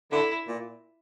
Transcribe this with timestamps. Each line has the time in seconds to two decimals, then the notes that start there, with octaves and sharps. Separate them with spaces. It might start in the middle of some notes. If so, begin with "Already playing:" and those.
0.12 D3 E4
0.47 A#2